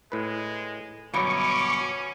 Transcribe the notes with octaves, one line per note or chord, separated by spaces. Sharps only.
A2 G#3 B4
G1 F#2 B2 F#3 C#4 C#6 D6